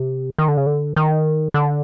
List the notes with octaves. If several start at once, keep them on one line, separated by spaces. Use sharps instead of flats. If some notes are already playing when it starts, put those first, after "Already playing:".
Already playing: C3
D#3
D3
C#3
D3
D#3
D3